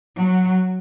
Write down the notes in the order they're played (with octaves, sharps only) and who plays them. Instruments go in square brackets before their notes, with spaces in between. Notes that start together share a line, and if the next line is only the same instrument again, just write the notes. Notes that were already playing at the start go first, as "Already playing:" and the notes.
[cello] F#3